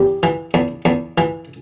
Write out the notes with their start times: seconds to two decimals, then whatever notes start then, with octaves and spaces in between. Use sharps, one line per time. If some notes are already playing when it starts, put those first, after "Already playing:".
Already playing: E2 G4
0.23 E3
0.54 E2
0.85 E2
1.18 E3